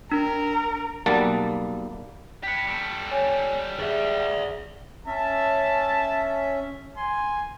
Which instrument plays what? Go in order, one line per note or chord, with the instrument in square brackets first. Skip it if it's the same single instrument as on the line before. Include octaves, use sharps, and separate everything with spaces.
[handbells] D4 [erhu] A#4
[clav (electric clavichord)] B1 G3 A#3 F#5 A5
[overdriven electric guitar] G4 B4 [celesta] B6 C#7
[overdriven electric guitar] G3 A4
[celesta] C#5 G#5
[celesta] G#4 [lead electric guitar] D5 E5
[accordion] C#4 E5 [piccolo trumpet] A5
[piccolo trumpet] G#5 [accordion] C6